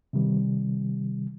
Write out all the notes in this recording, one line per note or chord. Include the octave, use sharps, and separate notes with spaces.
C3 D#3 G3